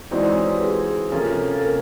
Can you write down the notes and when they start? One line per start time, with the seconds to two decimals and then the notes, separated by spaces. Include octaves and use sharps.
0.11 E3 G#3 C4 D#4 F#4 D5
0.27 C#5
0.45 B4
0.54 G4
0.61 G#4
1.12 C3 F3 A#3 C#4 F4 A4
1.51 A4
1.62 A#4